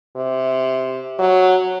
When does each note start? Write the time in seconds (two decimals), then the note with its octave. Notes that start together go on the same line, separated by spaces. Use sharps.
0.16 C3
1.19 F#3